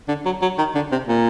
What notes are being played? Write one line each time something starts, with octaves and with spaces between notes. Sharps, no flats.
D3
F#3
F#3
D#3
D3
C3
A#2